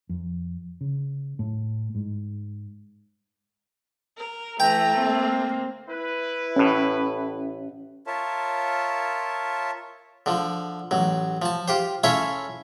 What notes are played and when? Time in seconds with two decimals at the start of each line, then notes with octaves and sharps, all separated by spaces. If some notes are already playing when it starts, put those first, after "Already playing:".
0.09 F2
0.81 C#3
1.39 A2
1.95 G#2
4.17 A#4
4.60 E3 A3 G5 A#5
4.98 A#3 C4
5.89 E4 B4
6.56 A1 A2 C#4
8.07 F4 A#4 C#5 E5 A5
10.26 D3 F3
10.91 A1 F#3
11.42 F3 A5
11.68 F4 G4 C5
12.04 C#4 E4 F4 A4 C#5 E5